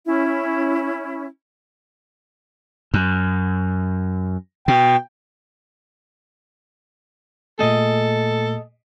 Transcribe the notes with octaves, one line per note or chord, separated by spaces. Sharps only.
C#4 E4
F#2
B2 G5
A#2 A3 A#3 G#4 A4 D#5